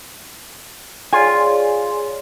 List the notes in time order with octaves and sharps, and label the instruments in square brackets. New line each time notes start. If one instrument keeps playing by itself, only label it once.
[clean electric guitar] F4 [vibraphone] G#4 C#5 D5 [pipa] G#5